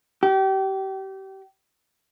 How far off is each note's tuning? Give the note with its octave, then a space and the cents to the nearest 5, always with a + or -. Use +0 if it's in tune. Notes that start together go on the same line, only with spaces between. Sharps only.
G4 -30